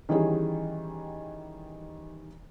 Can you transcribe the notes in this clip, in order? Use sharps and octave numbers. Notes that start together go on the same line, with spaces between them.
D#3 E3 G3 C#4 G#4